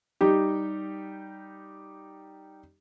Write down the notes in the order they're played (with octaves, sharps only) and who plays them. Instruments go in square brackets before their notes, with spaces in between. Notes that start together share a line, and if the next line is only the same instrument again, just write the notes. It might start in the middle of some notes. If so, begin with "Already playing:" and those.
[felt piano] G3 D#4 G4